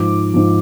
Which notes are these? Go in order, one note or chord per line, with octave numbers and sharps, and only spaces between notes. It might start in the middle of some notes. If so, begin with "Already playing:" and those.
Already playing: G#2 F3 D6
G#2 F3